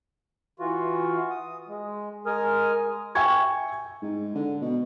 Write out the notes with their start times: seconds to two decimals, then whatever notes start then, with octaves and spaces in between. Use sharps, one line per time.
0.59 E3 F4 F#4
1.30 D#6
1.68 G#3
2.26 G#3 A#4 G#5 D#6 F6
3.15 E5 G5 G#5 C#6 G#6
4.02 G#2
4.35 D3
4.61 B2